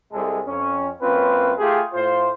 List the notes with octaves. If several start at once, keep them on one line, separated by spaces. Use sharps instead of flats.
C2 G#3 A4
F2 C#4
F#2 A#3 C4 C#4 F4 B4
A3 F4 G4 G#4
A2 F4 C5